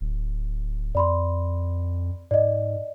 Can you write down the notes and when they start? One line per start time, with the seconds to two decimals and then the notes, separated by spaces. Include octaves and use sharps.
0.01 D1
0.95 F2 D5 B5 C6
2.31 G#2 D5 D#5